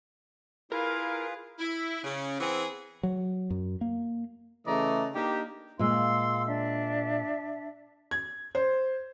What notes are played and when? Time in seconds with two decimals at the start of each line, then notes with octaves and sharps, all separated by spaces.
0.72 E4 F4 G#4 A#4 B4 F5
1.59 E4
2.04 C#3
2.40 E3 B3 C4 G#4
3.03 F#3
3.50 F#2
3.81 A#3
4.66 C#3 E3 A3 D5 D#5 A#5
5.14 A#3 D4 D#4 G4
5.79 A#2 G#3 F5 C6 E6
6.47 D4 E5
8.11 G#6
8.55 C5